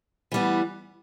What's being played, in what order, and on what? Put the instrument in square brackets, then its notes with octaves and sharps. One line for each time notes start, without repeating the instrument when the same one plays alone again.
[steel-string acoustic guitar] E3 G3 B3